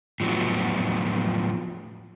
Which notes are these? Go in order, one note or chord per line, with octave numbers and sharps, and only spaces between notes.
A2 F3 F#3 B3